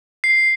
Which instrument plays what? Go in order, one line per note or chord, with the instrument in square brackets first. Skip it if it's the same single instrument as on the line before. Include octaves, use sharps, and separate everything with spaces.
[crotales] C7